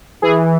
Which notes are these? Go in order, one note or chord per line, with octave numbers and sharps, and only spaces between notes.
E3 G#4